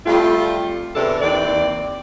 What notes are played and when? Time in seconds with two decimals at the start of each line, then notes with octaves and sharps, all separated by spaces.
0.06 G3 A3 C4 F4
0.95 E2 C3 D4 A4
1.21 D#2 E3 C4 D5